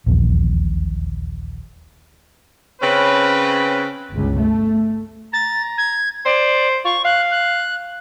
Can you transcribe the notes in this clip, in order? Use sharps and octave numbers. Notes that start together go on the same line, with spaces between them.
D#1 A#1 E2
C#3 C4 C#4 B4
G1 C#2
A3
A#5 A6
G#6
C5 D5
F4 C#6
F5 F#6
F#6